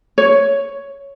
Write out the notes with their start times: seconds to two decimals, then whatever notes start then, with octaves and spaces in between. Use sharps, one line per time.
0.18 C#5